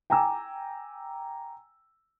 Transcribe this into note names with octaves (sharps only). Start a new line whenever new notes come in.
G5 G#5 A#5 D6 E6